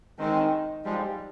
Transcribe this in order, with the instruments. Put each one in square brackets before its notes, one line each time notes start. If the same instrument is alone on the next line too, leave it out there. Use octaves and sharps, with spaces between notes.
[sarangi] D#3 [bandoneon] G#3 C4
[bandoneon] F3 G#3 [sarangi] G3